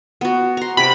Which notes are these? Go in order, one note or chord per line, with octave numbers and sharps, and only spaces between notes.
B3 F#4
A#5 C6
C3 D5 B5